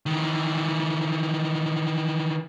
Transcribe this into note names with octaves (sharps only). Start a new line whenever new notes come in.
D#3 E3